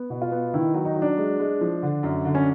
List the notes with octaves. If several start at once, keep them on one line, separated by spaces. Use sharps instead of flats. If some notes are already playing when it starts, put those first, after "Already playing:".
Already playing: B3
B2
F4
B3
D#3 E4
F#3
D#4
F#3
D4
G#3
G#3
F3
D3
F#2
D3
C#4